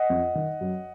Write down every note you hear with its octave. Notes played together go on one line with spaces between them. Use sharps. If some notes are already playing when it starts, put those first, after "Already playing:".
Already playing: D#5 F#5
F2
D#3
F#2